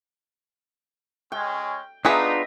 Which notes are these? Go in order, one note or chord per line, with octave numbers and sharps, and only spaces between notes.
G#3 C#4 G5
B3 D4 D#4 F4 G#4 B4 D#5 E5